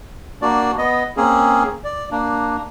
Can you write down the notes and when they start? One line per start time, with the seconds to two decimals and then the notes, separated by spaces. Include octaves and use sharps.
0.42 A#3 D4 F#4 D5
0.78 B3 D#5
1.17 A#3 C4 C#4 G#4
1.84 D5
2.11 A#3 D4